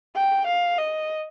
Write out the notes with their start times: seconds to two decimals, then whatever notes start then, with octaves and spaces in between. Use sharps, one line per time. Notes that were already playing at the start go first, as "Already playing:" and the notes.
0.16 G5
0.47 F5
0.79 D#5